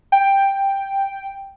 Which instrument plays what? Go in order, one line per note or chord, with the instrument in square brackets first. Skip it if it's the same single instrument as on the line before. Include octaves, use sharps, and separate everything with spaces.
[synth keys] G5